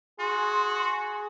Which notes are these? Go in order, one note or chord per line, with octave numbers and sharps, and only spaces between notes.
F#4 G#4 C6